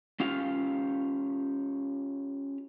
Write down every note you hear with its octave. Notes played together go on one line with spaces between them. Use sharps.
C#4 F4 G4 F5